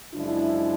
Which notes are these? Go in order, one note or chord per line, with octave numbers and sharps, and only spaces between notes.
F#2 C#3 F3 G#3 D4 E4